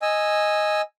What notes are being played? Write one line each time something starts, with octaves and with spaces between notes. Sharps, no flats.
D#5 G#5 E6